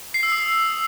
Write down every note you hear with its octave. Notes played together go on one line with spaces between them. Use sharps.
C7
E6
D#6